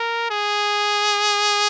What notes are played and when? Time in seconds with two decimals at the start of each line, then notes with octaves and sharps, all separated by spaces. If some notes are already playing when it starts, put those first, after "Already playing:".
Already playing: A#4
0.30 G#4